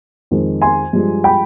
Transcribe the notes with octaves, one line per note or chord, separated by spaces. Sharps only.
F2 D#3 G#3
G#5 C6
G2 F3 G#3
G5 B5